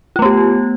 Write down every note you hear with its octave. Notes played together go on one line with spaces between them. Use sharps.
A3 B3 F4 G4